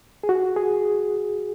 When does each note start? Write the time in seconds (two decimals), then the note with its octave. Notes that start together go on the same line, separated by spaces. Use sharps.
0.23 G#4
0.29 F#4
0.56 G#4